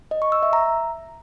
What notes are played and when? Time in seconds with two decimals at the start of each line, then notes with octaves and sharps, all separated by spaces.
0.11 D#5
0.22 C#6
0.32 E6
0.43 E5
0.53 A#5